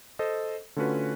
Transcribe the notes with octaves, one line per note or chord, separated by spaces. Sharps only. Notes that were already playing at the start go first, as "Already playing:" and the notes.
A4 C5 D#5
D3 A3 C#4 F4 F#4 B4